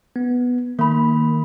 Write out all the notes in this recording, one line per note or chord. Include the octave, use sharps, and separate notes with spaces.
B3
D#3 A#3 B5